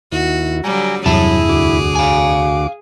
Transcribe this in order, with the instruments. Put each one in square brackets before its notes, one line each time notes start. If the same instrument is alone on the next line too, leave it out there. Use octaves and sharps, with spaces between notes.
[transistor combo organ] D#2 E4 [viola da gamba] F#4
[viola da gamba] D3 F#3 G3 [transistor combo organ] G#5 A#5
[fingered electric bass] E2 G2 C3 [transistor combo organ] F#3 [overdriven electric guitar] E4 A5 [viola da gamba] G#4
[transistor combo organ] D2 F#4 D6
[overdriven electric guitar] F5 G#5